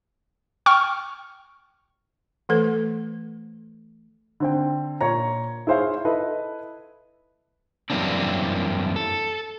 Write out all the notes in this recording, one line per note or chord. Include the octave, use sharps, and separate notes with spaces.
G5 C#6 F6
E3 A3 A4 B4 C5
D3 C4 G5
A#2 C#5 A#5
E4 G#4 C5 C#5 F5
E4 A4 B4 D#5
F#2 E3 G3 A#3 C4 D4
A4